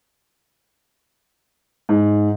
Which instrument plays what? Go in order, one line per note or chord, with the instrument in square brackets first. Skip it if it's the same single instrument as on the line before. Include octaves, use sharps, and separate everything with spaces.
[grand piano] G#2